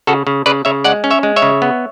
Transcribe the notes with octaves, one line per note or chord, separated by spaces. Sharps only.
C#3 F#4 A4
C#3
C#3 B4 D5
C#3 C#5 E5
G#3 D5 F#5
C#4
C#5 E5
G#3
C#5 E5
C#3
B3